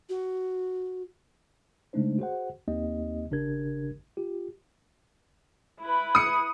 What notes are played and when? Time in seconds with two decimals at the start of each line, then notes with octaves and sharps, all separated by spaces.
0.09 F#4
1.93 C#3 G#3 A3 D4 D#4 C5
2.19 F#4 G#4 C5 F#5
2.68 D#2 A#3 C4 D#4 G4 D#5
3.31 G#1 C#3 D4 G4 A#4 G#6
4.17 F4 G4
5.81 E4 B4
6.15 D#6 C#7